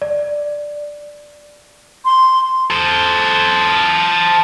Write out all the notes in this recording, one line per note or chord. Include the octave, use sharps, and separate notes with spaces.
D5
C6
A4 C5